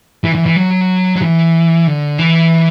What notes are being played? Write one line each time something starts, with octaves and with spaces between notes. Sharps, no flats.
E3
E3
E3
F#3
F#3
E3
D3
E3